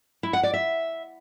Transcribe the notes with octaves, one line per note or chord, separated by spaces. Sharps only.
E4
F#5
D5
E5